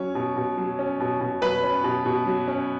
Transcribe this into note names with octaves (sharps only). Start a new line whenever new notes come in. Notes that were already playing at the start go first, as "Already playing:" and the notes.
Already playing: F#3 C#4 C#5
B2
B2
F#3
C#4
B2
B2
F#3 B4 B5
C#4
B2
B2
F#3
C#4